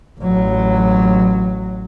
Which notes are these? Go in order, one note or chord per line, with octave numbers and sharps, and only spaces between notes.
A1 F#3